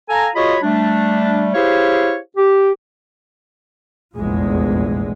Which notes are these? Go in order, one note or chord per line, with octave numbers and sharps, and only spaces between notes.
A4 F5 G#5 A#5
F4 F#4 G#4 C#5 D#5 B5
G3 A3 D4
E4 G4 G#4 C5 C#5 F5
G4
F1 A#1 E2 A#2 G#3